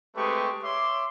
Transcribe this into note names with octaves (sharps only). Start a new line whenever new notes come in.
G#3 A3 C4 G4 B4 C#6
C#5 E5 C6 D6